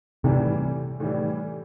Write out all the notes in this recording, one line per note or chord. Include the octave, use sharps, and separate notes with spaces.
A2 C3 E3 G3
A2 E3 G3